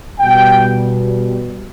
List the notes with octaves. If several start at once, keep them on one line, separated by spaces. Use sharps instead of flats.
B2 G3 G5